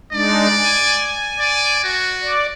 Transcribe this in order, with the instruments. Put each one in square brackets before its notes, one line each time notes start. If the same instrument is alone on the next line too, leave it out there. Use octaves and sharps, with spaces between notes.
[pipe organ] G#3 D4 D#4 [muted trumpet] D5
[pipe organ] G#5
[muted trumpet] D5
F#4
[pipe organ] D5